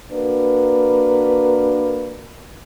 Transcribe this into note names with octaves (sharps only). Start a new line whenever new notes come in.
A#3 D4 F#4 A#4 B4